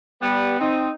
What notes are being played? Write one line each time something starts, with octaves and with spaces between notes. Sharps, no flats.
G3 B3
C4 D#4